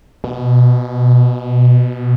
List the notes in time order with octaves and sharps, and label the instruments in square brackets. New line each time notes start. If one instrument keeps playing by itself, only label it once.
[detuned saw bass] B2